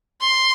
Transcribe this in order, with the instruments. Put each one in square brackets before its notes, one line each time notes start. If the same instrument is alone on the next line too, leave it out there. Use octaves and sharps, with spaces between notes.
[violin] C6